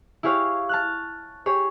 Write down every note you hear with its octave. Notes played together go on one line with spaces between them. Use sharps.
E4 G4 G#4 C#5 F5
A5 F6 F#6
G4 G#4 C#5